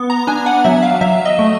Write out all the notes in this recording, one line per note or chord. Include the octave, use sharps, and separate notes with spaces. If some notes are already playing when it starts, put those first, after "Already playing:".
Already playing: B3
A#5
D4 G#5
F#5
F#3 E5
F5
F#3 E5
D#5
A3